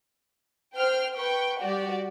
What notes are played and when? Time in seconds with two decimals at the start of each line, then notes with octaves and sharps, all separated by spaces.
0.77 C5 G5 F6
1.18 B4 G5 C#6
1.63 G3 F#4 G4 D5